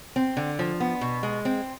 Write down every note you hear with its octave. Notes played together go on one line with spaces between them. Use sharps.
C4
D3
F3
B3
B2
G#3
C4